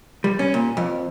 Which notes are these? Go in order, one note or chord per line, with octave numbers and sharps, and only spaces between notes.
G3
C#4
A#2
F2